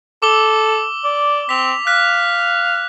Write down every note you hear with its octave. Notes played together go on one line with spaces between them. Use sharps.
A4 D6 E6 G7
D5
C4 B6 F7
F5 F#6 B6